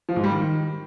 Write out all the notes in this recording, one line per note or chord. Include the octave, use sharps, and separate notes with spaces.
F3
G#2
G3
D#3